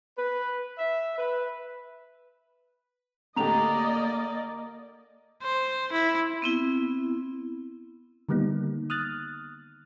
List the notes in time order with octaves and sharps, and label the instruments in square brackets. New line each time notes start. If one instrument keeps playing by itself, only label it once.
[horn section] B4
E5
B4
[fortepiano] A2 D3 G4 [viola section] A#3 D5 D#5 [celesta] A#5 F7
[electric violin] C5
E4
[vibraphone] B3 C4 E4
[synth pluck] D3 D#3 G3 A#3 B3 D#4
D#6 F6 F#6 A6